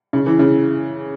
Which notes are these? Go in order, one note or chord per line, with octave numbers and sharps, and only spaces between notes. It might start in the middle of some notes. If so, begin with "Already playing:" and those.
C#3
E3
C#3